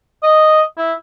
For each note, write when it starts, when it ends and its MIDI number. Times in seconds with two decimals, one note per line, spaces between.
0.23 0.61 75
0.77 0.93 64